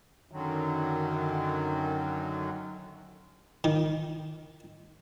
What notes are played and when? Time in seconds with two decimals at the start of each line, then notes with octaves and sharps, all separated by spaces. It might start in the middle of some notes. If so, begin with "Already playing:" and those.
0.32 F#2 D3 D#3 F#3
3.64 D#3